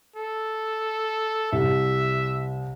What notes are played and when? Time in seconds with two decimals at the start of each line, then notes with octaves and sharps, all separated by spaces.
0.16 A4
1.53 C2 E5